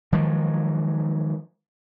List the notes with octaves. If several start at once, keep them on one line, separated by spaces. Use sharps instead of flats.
D#3 F3 F#3 G#3